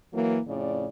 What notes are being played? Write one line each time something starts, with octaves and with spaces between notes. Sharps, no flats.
E3 F#3 A#3
F2 A2 C#3 D5